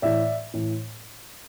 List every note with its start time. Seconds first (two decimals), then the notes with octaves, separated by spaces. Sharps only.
0.02 A2 E3 D5 E5
0.54 A2 E3